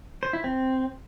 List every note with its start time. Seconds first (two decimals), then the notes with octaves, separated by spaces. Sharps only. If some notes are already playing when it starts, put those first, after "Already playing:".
0.23 C5
0.33 E4
0.44 C4